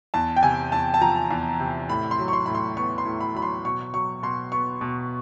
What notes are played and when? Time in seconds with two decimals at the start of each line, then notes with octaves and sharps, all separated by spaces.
0.14 E2 A5
0.36 G5
0.43 C3 G#5
0.72 E2 A5
0.94 A5
1.01 F3 A#5
1.31 E2
1.60 C3
1.89 A2 B5
2.11 C6
2.19 F#3
2.28 C#6
2.33 C6
2.46 A2 B5
2.55 C6
2.77 B3 C#6
2.98 C6
3.05 A2
3.21 B5
3.35 F#3 B5
3.42 C6
3.65 B2 C#6
3.94 F#3 C#6
4.23 B2 C6
4.52 B3 C#6
4.81 B2